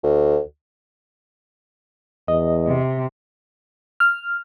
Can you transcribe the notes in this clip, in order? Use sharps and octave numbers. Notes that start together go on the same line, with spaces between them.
D2
E2 D#5
C3
F6